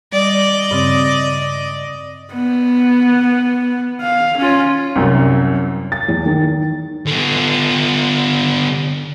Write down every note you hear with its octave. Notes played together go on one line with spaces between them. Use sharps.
G3 D5 D#5
G2 C#3 C4
B3
F5
C#4 F4
C2 F#2
A6
E2
D#3
D3 B3